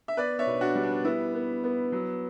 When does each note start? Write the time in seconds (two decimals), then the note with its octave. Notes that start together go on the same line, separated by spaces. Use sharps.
0.08 E5
0.17 B3 B4 D5
0.39 C#5 E5
0.47 B2
0.61 D4 F#4
0.75 G3
0.83 D4
1.05 B3 E4
1.34 B3
1.64 B3
1.92 F#3